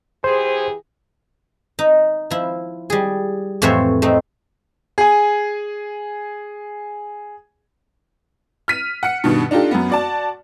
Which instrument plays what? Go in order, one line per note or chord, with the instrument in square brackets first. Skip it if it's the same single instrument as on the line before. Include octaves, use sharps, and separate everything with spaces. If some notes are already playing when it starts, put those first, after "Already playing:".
[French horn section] E3 G4 G#4 [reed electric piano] C5
[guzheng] D#4
F3 E4
G3 G#4
F2 A2 E3 C5 C#5 E5
A3 C4 D#4
[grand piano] G#4 G#5
[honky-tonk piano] F6 B6 D#7
F#5 C#7
G2 B2 D#3
D4 D#4 F4 G4 A4
F#2 B3
F#4 D5 A5